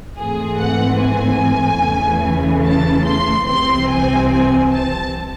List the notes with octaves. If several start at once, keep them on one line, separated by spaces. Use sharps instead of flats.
G#2 E3 A3 C4 G#4
F#5
G#5
E2 C#3 E3 A3
A5
C6
C2 C3 E3 C4 C6
G#5
G#5
A5